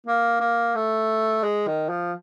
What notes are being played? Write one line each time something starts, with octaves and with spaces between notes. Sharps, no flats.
A#3
A#3
A3
G#3
D#3
F3